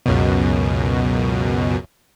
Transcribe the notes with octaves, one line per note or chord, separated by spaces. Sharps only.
C#2 F#2 B2